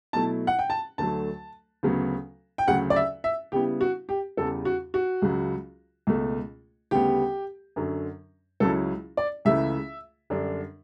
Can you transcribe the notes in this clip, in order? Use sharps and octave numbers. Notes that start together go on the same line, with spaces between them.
B2 F#3 A3 E4 A5
F#5
G5
A5
D2 D3 F#3 A3 A5
D2 C#3 F#3 B3
G5
D2 C#3 F#3 F#5
D5
E5
E5
C#3 G3 B3 E4 G4
F#4
G4
E2 C#3 G3 A4
F#4
F#4
C#2 C#3 F#3
C#2 B2 A3
D2 C#3 G3 B3 G4
F#2 D3 F#3
C#2 C#3 F#3 C#4 E4 A4
D5
C#2 C#3 E3 A3 E5
F#2 D3 G3 D4